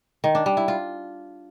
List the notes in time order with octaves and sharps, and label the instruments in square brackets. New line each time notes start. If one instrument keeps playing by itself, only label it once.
[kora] D#3
D4
G3
E4
F4